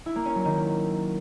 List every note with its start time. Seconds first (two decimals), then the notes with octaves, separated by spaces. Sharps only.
0.06 E4
0.16 A#3
0.25 C#4
0.35 F#3
0.45 D#3